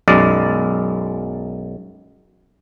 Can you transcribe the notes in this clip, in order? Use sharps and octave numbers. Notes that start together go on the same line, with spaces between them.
B1 F#2 G#3 D5